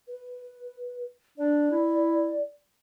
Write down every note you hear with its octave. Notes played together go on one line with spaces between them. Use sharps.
B4
D4 D5
E4